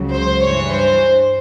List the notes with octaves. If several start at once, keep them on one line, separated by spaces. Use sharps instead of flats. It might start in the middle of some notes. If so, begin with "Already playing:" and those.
Already playing: C#2 C#3 F#3
C5
G2 E3 C#5
C5